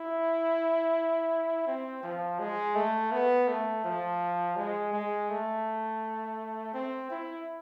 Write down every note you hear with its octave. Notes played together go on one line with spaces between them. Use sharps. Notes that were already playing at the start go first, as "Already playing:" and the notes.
Already playing: E4
C4
F3
G#3
A3
B3
A3
F3
G#3
G#3
A3
C4
E4